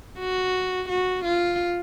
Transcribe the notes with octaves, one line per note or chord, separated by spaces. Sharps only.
F#4
F#4
F4